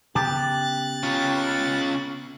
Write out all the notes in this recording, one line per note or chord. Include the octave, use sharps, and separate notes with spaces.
C#3 B3 G4 F#6 A6
C#4 F4